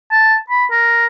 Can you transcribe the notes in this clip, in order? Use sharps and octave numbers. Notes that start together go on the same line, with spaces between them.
A5
B5
A#4